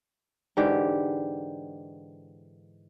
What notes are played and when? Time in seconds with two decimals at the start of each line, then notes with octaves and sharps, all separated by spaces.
0.57 G#2 D3 E3 G4